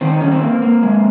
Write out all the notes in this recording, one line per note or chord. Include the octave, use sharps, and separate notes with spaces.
D#3 C4
D#4
D#3 C#4
C4
A#3
A#3
G#3